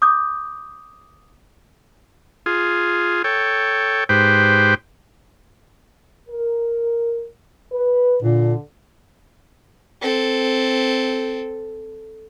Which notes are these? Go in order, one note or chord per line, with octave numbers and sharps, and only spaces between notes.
D6 D#6 G6
F4 G#4
A4 C#5 G5
G#2 G4 B4 C5 G5
A#4
B4
A#2 D3
C4 A4